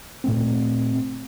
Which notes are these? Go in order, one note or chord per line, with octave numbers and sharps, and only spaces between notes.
A#2 A3 C4